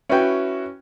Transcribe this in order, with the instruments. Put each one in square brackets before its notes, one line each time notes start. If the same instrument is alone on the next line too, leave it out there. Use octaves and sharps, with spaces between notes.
[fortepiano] C#4 B4 G5 [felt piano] E4 F#4